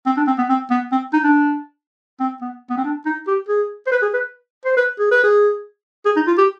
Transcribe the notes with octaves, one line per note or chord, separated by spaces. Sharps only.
C4
D4
C4
B3
C4
B3
C4
D#4
D4
C4
B3
B3
C4
D4
D#4
G4
G#4
C5
B4
G#4
B4
C5
B4
G#4
B4
G#4
G#4
D#4
F4
G4